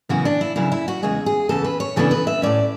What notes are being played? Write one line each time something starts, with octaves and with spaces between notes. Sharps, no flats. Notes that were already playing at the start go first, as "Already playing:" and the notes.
F#2 C#3 E3 B3 F#4
D4
E4
F#2 C#3 F#3 E4
E4
F#4
E2 C#3 G#3 G#4
G#4
E2 C#3 E3 A4
B4
C#5
C#3 E3 B3 D4 A4
B4
E5
A2 F#3 C#4 D5